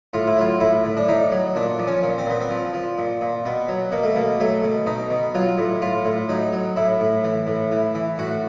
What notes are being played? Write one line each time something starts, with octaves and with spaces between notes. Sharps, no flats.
A2 F4
E4
F#3 F4
A2 E4
A2
D4
A2 D#4
F#3
A#2 D4
F3
C#4
A#2
C4
A#2 B3
C4
F3
F3
A#2
A#2
B2 B3
F#3
B2 A#3
A3
B2 A#3
F#3 A3
B2
B2 D#4
B2
F#3 F4
A2
A2 F4
A2
F#3 D#4
F#3
A2 E4
A2
E3
A2
E3
E3
A2 F#4